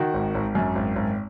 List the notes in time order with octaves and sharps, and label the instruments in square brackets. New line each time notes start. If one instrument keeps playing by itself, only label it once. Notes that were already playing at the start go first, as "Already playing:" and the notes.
Already playing: [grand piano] D#3 F#4
G#1
G#1
F#2
G#1
G#1